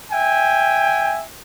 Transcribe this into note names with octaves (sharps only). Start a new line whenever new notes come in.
E5 G5 G#5